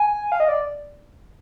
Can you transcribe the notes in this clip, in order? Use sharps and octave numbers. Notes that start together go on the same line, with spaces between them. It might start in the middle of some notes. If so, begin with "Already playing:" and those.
Already playing: G#5
F5
D#5
D5